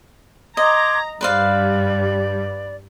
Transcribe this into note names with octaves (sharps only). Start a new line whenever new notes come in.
D#5 A#5 C6 D6 G#6
G2 G3 B4 C5 D5 F5